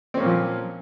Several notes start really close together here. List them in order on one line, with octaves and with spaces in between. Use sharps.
C4 C#4 A#3 A#2 F3